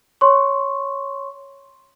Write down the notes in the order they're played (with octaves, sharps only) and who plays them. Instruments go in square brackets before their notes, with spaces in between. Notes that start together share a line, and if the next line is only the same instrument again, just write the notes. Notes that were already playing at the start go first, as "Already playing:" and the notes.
[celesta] C#5 C6 C#6